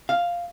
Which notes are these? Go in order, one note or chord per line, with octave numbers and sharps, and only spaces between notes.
F5